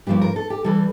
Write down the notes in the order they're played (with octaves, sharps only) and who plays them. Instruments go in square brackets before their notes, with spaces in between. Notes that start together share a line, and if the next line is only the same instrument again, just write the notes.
[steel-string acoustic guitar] G2 F3 A#3 G4
A#4
A4
G4
E3 G3 A4